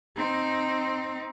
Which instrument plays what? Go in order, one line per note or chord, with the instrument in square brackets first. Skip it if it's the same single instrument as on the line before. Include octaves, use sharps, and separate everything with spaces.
[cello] C4 D#4